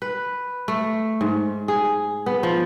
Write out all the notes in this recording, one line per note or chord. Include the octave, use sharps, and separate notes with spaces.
B4
A3
G#2
G#4
B3
F3